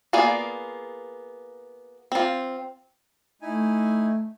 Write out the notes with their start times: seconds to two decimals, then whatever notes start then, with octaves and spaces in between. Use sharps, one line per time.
0.13 A#3 B3 F4 G#4 D5
2.12 C4 F4
3.42 A3 D#4 E4 G#5